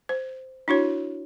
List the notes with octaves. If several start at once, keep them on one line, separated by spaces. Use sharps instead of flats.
C5
D4 E4 F#4 C#5